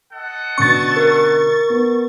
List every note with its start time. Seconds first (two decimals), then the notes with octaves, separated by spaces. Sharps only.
0.12 A4 D#5 F#5
0.58 B2 D3 C#4 C#6 A6
0.97 A#4
1.70 B3